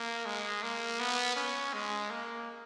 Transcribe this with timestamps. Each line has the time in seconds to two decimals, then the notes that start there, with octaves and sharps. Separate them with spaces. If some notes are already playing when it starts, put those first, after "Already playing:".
Already playing: A#3
0.26 G#3
0.63 A#3
1.00 B3
1.36 C#4
1.74 G#3
2.10 A#3